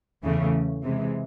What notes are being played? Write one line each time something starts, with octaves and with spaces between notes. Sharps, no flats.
E2 C#3 E3 A3
C3 E3 G#3